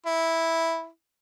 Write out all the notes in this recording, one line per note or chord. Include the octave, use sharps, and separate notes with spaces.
E4